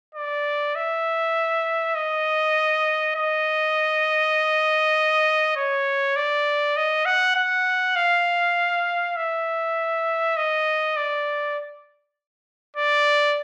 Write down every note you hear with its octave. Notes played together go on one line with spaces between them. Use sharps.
D5
E5
D#5
D#5
C#5
D5
D#5
F#5
F#5
F5
E5
D#5
D5
D5